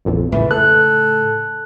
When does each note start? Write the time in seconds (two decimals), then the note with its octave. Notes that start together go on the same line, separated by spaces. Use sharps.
0.05 A#1 F2
0.32 A2 C#3 E3 A3
0.51 A4 F#6